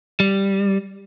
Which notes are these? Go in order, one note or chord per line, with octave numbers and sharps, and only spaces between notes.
G3